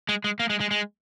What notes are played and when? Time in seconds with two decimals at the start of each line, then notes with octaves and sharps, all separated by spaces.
0.09 G#3
0.24 G#3
0.40 A#3
0.50 G#3
0.60 G#3
0.71 G#3